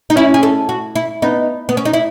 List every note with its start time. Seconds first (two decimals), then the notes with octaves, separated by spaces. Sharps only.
0.10 D#4
0.16 C#4 E4
0.34 G#4
0.43 A4
0.69 F#4
0.95 E4
1.22 B3 D#4
1.69 B3
1.77 C#4
1.85 D#4
1.93 E4